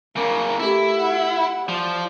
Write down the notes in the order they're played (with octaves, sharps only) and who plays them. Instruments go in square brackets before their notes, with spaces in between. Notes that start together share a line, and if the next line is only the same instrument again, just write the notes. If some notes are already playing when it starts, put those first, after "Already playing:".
[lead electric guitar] C#3 A#3 [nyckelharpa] A#4
[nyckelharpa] A3 G4 [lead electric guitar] E4
[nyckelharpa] F#4 F#5
[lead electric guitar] F3 [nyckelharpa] D5